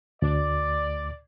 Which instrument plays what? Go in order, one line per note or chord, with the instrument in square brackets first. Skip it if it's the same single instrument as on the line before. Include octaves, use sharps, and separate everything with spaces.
[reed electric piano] D2 [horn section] D5